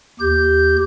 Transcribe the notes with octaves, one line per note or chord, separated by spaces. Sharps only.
D#2 G4 G6